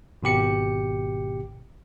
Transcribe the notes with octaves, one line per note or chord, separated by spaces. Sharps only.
G#1 B2 G4 C#7